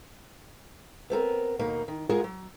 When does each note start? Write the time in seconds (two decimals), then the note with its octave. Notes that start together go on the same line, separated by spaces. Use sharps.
1.10 B3 C4 A4 A#4
1.59 D#2 B2 A#3 D#4
1.88 D#3
2.09 G#3 F4 G#4 A#4 F#5
2.24 F#3